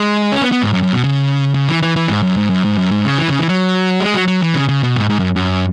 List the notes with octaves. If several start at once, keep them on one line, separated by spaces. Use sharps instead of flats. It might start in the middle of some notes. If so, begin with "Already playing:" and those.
Already playing: G#3
C#4
B3
B3
G#2
F#2
F#2
B2
C#3
C#3
E3
E3
E3
G#2
F#2
G#2
F#2
G#2
F#2
G#2
C#3
E3
C#3
E3
F#3
G#3
F#3
F#3
E3
C#3
C#3
B2
G#2
G#2
F#2
F#2